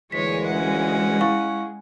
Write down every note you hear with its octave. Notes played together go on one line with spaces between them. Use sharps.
D2 A#2 E3 G#3 C#5 B6
C#4 F#5
E4 F5 C#6